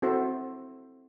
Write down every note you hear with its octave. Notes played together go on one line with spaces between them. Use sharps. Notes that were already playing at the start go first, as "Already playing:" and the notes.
C4 E4 F#4 A4 C5